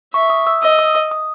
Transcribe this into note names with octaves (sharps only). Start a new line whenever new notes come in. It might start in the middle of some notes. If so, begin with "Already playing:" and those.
E5 C#6
D#6
E6
D#5 E6
D#6
D#6
D#6